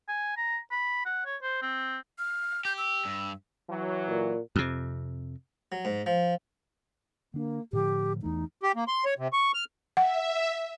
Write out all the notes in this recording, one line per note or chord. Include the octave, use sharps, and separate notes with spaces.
G#5
A#5
B5
F#5
C#5
C5
C4
F6
G4 G6
E6
G2
E3 F#3
A#2
F2 C3
F#3
G#2
F3
D3 A#3 D4
A2 D3 F3 G4
E2 E3 A3 D#4
G4
A#3
C6
C#5
C3
C#6
F6
E5 F#5